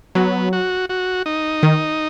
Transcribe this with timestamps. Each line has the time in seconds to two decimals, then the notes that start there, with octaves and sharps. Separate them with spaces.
0.15 F#3 B3
0.53 F#4
0.89 F#4
1.26 D#4
1.63 D#3